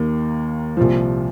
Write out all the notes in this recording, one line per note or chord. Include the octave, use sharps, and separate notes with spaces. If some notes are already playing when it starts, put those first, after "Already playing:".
Already playing: D#2 D#3 A#3
C2 A#2 F3